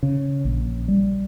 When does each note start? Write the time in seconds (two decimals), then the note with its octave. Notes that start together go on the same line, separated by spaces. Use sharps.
0.03 C#3
0.45 A#1
0.88 G3